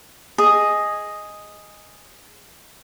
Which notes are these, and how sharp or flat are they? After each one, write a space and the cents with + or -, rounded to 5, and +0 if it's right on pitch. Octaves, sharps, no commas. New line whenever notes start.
G#4 +0 D#5 +0